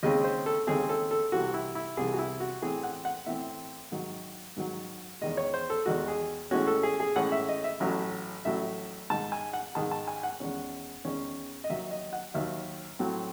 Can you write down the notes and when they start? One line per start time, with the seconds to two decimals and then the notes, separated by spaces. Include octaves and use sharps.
0.03 D#2 C#3 G#3 C4 D#5
0.24 C5
0.46 A4
0.67 D#2 C#3 G#3 C4 G#4
0.89 A4
1.11 A4
1.32 C2 C3 E3 F#4
1.54 E4
1.75 E4
1.97 C2 C3 E3 G#4
2.13 F#4
2.19 E4
2.40 F#4
2.62 A2 E3 C4 G#4
2.83 F#5
3.05 F#5
3.26 A2 E3 C4 E5
3.92 G#2 D#3 F#3
4.56 G#2 D#3 F#3
5.21 E2 D#3 G#3 D#5
5.37 C#5
5.54 C5
5.70 A4
5.86 E2 D#3 G#3 F#4
6.08 G#4
6.51 A2 E3 G#3 C#4 F#4
6.67 A4
6.83 G#4
7.00 G#4
7.16 A2 E3 G#3 C#4 F#5
7.32 E5
7.48 D#5
7.64 E5
7.80 A1 A2 F#3
8.45 A1 A2 F#3 E5
9.10 G#2 D#3 G#3 A5
9.32 G#5
9.53 F#5
9.75 G#2 D#3 G#3 A5
9.91 A5
10.08 G#5
10.23 F#5
10.40 E2 D#3 G#3 C#4
11.05 E2 D#3 G#3 C#4
11.64 D#5
11.70 D#2 D#3 F#3 E5
11.91 D#5
12.13 F#5
12.34 D#2 D#3 F#3 E5
12.99 A2 F#3 C4